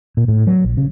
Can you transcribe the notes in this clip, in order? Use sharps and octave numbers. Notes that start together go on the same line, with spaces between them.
A#2
A2
F#3
A#1
C#3